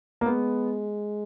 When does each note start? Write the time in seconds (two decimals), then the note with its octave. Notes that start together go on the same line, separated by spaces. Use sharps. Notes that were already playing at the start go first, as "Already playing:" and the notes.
0.21 A#3
0.26 G#3 B3